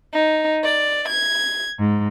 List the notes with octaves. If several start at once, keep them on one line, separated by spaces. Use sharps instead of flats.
D#4
D5
G#6
G#2